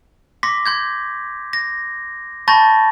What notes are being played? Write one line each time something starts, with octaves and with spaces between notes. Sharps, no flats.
C6 D6 A#6 B6
C6 G6 G#6
A#6
A5 B5 C#6 G6 A6 A#6